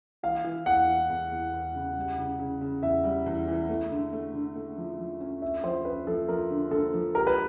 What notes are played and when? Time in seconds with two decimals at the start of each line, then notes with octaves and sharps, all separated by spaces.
0.23 E3 F5
0.44 E3
0.66 E2 F#5
0.88 E3
1.09 E2
1.31 E2
1.53 E2
1.74 C#3
1.96 G3
2.18 C#3
2.39 C#3
2.61 C#3
2.83 E2 E5
3.04 G3
3.26 E2
3.48 E3
3.69 A3
3.91 D3
4.13 A3
4.34 D3
4.55 A3
4.77 F3
4.99 F3
5.21 C#4
5.42 C#4 E5
5.64 F3 C5
5.85 C#4 B4
6.07 F3 A4
6.28 F3 A#4
6.51 D3
6.71 D3 A4
6.93 F3
7.15 G4 A#4
7.27 B4